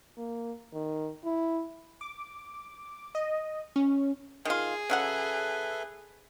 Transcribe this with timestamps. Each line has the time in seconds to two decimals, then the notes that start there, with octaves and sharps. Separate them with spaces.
0.18 A#3
0.73 D#3
1.25 E4
2.01 D6
3.15 D#5
3.76 C#4
4.45 D#3 F4 G#4
4.90 C#3 F#3 A4 B4 E5 F#5